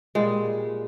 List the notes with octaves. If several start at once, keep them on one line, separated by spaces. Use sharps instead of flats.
A#2 G3 G#3